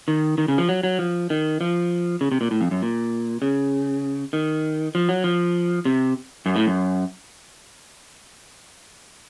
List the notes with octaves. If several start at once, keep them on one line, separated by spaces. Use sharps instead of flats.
D#3
D#3
C#3
F3
F#3
F#3
F3
D#3
F3
C#3
C3
A#2
A2
F2
F#2
A#2
C#3
D#3
F3
F#3
F3
C3
F#2
A2
F#2